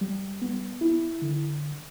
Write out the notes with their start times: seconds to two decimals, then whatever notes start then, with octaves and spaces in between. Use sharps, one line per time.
0.01 G3
0.42 B3
0.81 E4
1.22 D3